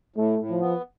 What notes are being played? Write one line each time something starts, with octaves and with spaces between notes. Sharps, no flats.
A2 A3
A2
F3
B3